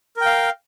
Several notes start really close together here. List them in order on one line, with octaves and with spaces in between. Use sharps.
A#4 G5 F5